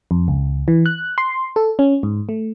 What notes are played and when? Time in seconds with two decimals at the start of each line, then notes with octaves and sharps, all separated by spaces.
0.11 F2
0.28 C#2
0.68 E3
0.86 F#6
1.18 C6
1.56 A4
1.79 C#4
2.03 G#2
2.29 A3